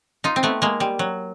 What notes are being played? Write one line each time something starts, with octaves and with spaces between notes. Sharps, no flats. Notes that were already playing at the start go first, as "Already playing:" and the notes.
D#4 F4
C4
A3 B3
G#3 A#3
G3
F#3